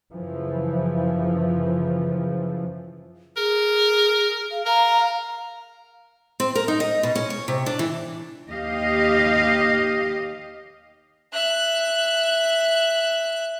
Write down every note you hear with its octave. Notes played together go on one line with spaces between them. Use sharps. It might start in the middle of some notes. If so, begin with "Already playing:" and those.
F#2 C#3 E3 F3
G#4 A#4
F5
A#4 F5 A#5
C4
A#4
D#4
D#5
B2
C#4
C#5
C3
D4
E3
D#2 G4 D#5 F5
E5 F#6